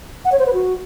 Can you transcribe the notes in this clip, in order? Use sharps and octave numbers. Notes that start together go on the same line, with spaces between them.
F#5
C#5
C5
B4
F#4